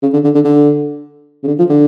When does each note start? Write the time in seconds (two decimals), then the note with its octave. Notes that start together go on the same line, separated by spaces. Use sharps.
0.02 C#3
0.13 D3
0.24 D3
0.35 D3
0.45 D3
1.43 C#3
1.47 D3
1.59 F3
1.69 D3